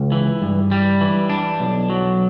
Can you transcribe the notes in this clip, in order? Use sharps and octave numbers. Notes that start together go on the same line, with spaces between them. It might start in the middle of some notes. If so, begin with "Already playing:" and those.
Already playing: C#2
E3
G2
G3
E3
D4
B1
F#3